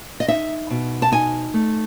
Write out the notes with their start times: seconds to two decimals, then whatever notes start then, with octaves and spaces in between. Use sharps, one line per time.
0.20 D#5
0.28 D#4 E5
0.70 B2
1.02 A5
1.12 D#4 G#5
1.54 A3